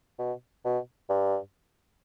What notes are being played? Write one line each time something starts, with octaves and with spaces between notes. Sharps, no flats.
B2
B2
G2